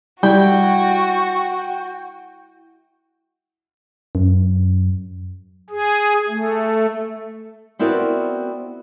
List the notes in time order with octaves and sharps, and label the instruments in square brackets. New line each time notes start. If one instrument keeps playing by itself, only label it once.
[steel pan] G3 [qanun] E4 [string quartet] F#4 [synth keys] G5
[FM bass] F#2
[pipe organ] G#4
A3
[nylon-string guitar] B3 C4 E4 F#4 A#4 D5